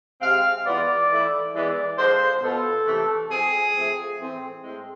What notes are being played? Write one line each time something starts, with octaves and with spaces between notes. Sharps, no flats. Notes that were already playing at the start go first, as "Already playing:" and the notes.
C3 G#3 C4 F5
E3 G#3 B3 F4 D5
E3 A3 E4
E3 G#3 B3 D5
D3 F3 G#3 C5
B2 B3 F4 A4
C3 E3 A3
F3 G#3 C4 G#4
F3 A3 C4
A2 E3 A3 C4
A2 G#3 C4